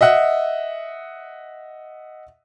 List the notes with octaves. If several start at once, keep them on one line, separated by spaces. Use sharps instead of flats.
D#5 E5 F#5